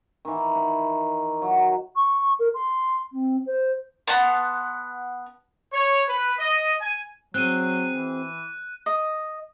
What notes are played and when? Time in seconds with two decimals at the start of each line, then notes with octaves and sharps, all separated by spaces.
0.25 D#3 E3
0.55 B5
1.42 F#3
1.96 C#6
2.39 A#4
2.54 C6
3.12 C4
3.46 C5
4.07 B3 F#5 A5 C6
5.73 C#5
6.09 B4
6.39 D#5
6.81 G#5
7.34 F#3 C4 F#4 G#4 F#6 D#7
7.93 E3
8.86 D#5